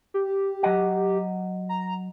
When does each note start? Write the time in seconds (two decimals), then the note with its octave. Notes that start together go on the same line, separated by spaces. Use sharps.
0.14 G4
0.63 F#3 D#5 F#5
1.69 A#5